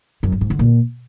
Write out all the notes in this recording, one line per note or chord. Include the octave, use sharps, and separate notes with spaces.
F#2
G2
G#2
D3
A#2